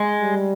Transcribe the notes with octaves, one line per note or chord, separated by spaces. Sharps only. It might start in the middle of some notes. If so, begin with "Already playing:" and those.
Already playing: G#3
G3